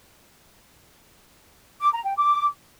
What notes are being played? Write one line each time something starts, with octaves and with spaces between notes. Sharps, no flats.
D6
A#5
G5
D6